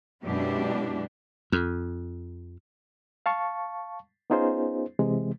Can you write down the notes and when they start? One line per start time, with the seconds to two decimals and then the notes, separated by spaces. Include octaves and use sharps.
0.24 F#2 B2 G#3 D4 E4 G4
1.52 F2
3.26 F5 A5 C#6
4.30 B3 C#4 D#4 F4 G#4 C5
4.99 C3 E3 G#3